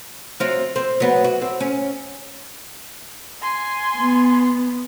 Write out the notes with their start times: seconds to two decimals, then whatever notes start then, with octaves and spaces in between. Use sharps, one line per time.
0.40 F#3 C4 F4
0.76 C4
1.00 F#3 B3
1.24 F#4
1.42 C4
1.60 C#4
3.40 G#5 C6
3.97 B3